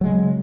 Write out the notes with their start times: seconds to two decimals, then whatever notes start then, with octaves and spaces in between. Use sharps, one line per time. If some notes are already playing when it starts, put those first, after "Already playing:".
0.01 F#3
0.04 G#3
0.06 C#3